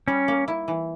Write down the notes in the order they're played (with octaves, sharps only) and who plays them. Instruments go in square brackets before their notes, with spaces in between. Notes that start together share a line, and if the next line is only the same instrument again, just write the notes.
[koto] G3 [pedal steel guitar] C#4
[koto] A#3
E4
E3